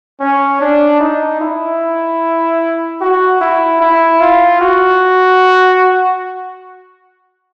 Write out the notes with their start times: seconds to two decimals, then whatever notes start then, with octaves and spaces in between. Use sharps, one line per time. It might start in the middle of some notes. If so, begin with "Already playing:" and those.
0.20 C#4
0.61 D4
1.00 D#4
1.41 E4
3.01 F#4
3.41 E4
3.81 E4
4.20 F4
4.61 F#4